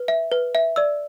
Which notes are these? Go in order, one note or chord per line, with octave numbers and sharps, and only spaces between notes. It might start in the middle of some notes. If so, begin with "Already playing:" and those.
Already playing: B4
E5
B4
E5
D5 E6